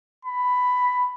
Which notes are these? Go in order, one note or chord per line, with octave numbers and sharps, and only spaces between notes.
B5